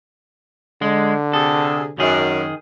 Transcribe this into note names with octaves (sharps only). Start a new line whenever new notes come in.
D3 G#3
C3 G#4 A4
F#2 D#3 G#4